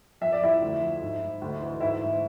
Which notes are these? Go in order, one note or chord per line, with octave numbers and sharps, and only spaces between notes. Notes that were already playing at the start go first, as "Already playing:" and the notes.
F2 E5
D5
F2 E4 E5
D2
F3
G#2
G#2
D2
E3
G#2 E4 E5
G#2